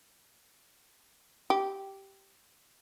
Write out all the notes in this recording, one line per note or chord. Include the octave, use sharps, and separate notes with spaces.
G4